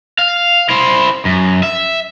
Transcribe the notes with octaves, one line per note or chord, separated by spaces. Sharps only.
F5
E4 C5
F#2
E5